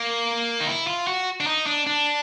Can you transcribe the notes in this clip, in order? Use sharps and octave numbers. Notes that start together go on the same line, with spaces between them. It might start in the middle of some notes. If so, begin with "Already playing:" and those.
Already playing: A#3
D#4
E4
F4
F#4
D4
D#4
D4
D4